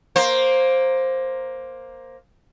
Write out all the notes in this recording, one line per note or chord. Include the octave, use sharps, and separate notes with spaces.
A#3 C5